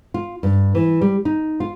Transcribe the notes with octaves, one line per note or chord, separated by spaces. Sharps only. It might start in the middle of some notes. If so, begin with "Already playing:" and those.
F4
G2
E3
G3
D#4
F4